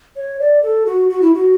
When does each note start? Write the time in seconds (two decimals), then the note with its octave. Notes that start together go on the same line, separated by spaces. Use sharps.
0.16 C#5
0.40 D5
0.62 A4
0.86 F#4
1.10 F#4
1.22 E4
1.34 F#4